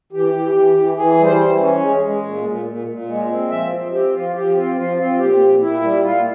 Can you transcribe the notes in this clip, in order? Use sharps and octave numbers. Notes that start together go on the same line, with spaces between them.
E3 G4
E3
E3
E3
E3 G#4
G3
C5
E3
C#4
G#3
G#3
A#2
A#2
A#2
A#2
G#3
C4
F3 E5
C4
C4 G4
F3 F4
F3 G4
C4 F4
F3 F4
C4 F4
A#2 G4
A#2
A#2 E4
G3
A#2 F4